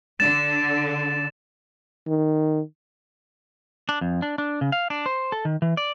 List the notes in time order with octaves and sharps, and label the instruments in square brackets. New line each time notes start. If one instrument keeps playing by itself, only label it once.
[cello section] D3 [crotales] A6 E7
[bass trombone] D#3
[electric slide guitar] D4
F2
D4
D4
C#3
F5
D4
C5
A4
D#3
E3
D5